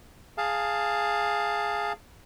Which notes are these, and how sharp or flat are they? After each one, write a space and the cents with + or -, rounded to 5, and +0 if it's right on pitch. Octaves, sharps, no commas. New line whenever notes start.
G#4 +0 F5 +0 A5 +15